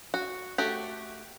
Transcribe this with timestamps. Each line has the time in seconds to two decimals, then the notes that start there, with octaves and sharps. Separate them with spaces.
0.14 F#4
0.58 A3 F#4 G4